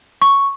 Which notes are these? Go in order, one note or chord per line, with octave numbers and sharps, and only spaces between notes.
C#6